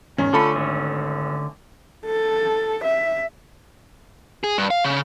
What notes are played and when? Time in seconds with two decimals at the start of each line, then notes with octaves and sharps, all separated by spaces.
0.18 E2 G#2 D#3 C#4
0.33 D3 A3 C#4 F4 A4 B5
0.56 G#1
2.06 A4
2.84 E5
4.44 G#4
4.58 G2
4.70 F5
4.84 C#3